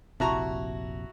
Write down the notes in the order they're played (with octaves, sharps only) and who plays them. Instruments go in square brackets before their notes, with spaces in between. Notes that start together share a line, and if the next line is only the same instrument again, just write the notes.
[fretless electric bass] F1 A#1 C3 [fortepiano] E4 F#4 A#5 [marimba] A5 C#6